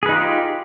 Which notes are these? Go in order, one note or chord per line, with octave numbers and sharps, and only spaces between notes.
D#4 F4 G4 G#4 B4